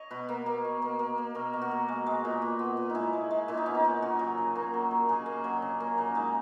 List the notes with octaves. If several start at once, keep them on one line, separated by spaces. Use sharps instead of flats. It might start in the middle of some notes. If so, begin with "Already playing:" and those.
Already playing: C#5 D#5
B2 B4
A#3
A#3
B2
A#3
A#3
A#3
B2 A#4
B2
F#4
A#3
G#3
G#3
A#2
A#2
B3
A#2
D#4
G#3 E4
G#3
G#3
A#2 E4
D#4
B3 C#4
D#4
A#2
C#3 F#4
F#3
C#3
A#3
F#3
A#3
C#3 G#4
A#3
F#3
C#3
A#3
C#3
G#3 D#4